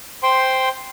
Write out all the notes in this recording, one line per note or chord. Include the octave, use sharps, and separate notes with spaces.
C5 G5 C6